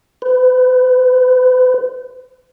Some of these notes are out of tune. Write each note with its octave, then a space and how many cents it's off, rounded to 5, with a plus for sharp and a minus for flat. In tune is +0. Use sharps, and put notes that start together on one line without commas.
B4 +45